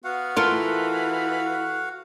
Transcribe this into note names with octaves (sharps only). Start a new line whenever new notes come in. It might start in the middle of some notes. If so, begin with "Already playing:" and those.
B3 F#4 F5 F#5
E3 F4 A4 A#4